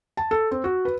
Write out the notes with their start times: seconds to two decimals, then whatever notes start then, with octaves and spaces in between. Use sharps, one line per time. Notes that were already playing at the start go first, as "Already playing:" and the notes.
0.17 A5
0.31 A4
0.51 C4
0.64 F#4
0.85 B4